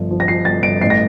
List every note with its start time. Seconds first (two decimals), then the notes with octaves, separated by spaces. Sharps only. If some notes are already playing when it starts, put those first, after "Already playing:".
Already playing: G1 F3
0.11 F3
0.20 A#6
0.28 F3 C7
0.45 G1 A6
0.63 G1 D7
0.81 A1 C7
0.90 A#6